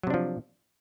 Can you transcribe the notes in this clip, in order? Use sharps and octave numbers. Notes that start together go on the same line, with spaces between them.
C3 F3 F#3 D4